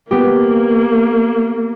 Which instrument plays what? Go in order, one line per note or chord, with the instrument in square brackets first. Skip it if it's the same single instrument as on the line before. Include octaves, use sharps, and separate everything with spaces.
[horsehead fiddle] A#3 [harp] B3 G4